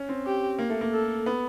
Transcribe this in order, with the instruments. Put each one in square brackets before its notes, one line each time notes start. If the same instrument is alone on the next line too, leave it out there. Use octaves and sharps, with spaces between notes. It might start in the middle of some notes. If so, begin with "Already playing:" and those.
Already playing: [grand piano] C#4
C4
[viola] G4
[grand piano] A#3
A3
A#3
[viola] A4
[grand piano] B3